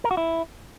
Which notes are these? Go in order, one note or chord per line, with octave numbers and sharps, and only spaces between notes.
A#4
F#4
E4